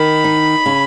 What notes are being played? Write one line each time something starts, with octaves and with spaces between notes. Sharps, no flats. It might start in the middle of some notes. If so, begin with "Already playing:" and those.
Already playing: D#3 B5
D#4
C#3